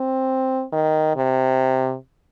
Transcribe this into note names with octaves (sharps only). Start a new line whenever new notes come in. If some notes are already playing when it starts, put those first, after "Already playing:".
Already playing: C4
D#3
C3